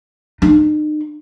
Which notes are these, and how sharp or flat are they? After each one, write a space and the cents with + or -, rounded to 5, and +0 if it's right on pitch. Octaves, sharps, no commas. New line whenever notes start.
D#4 -40